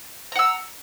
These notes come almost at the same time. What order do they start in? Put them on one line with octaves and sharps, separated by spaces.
A#5 F#5 E6